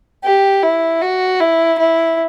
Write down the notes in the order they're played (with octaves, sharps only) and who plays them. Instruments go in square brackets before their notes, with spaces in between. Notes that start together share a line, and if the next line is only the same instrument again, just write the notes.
[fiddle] G4
E4
F#4
E4
E4